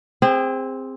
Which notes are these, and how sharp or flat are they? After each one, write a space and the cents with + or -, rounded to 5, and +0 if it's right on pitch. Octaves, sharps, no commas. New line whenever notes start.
C4 +0 G#4 -30